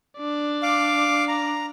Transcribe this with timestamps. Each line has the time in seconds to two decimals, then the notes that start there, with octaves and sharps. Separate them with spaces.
0.18 D4 D5
0.63 F5 D6
1.28 A#5